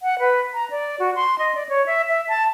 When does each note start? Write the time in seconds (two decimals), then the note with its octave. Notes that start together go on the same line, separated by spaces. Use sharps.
0.02 F#5
0.19 B4
0.54 A#5
0.70 D5
1.00 F#4
1.15 C6
1.39 D#5
1.55 D5
1.69 C#5
1.86 E5
2.09 E5
2.28 A5